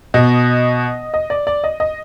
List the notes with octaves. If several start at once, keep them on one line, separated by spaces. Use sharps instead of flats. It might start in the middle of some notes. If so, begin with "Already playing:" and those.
B2 D#5
D#5
D5
D5
D#5
D#5